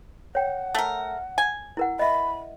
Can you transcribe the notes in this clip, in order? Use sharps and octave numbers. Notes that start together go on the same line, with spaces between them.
C#5 F#5 G5
A3 A#4
G#5
E4 A#4 F#5
D#5 E5 B5